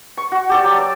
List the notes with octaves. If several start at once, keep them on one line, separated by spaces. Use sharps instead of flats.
C#6
F#4
G4 A4 D5
F#3
D5